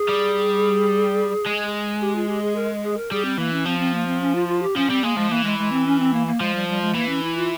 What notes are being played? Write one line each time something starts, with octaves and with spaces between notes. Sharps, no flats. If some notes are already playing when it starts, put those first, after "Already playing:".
Already playing: G#4
G3
G#3
G4
F4
G4
G#4
A#4
G#4
A#4
G3 G#4
C4
E3 A#3
C#4
F3 C4
C4
A#3
C4
C#4
F4
F4
G4
F3 C#4
G3 C4
G#3 A#3
F3 G#3
E3 A#3
G#3
G#3
C4
C#4
C4
A#3
A#3
F3 G#3
G3
G3
G#3
E3 A#3
C#4
E4
F4